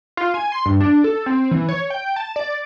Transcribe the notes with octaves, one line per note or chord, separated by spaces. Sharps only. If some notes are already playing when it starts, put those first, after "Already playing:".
F4
G#5
C6
G2
D4
A4
C4
E3
C#5
G5
A5
D5